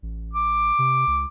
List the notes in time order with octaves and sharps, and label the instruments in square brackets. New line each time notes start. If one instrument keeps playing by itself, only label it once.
[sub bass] A1
[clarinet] D6
[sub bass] C3
C#2